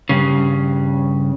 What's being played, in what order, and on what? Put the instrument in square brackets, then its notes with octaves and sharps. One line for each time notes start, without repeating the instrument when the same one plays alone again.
[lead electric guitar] G2 C#3